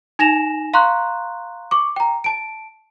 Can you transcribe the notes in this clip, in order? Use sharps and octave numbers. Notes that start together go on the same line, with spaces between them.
D#4 G#5 A#6 E7 F7
F5 A#5 C6 C#6 F#6
C#6 D6
G5 A#5
A5 D7